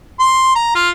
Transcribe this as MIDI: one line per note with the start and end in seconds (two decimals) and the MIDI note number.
0.19 0.51 84
0.55 0.73 82
0.75 0.89 65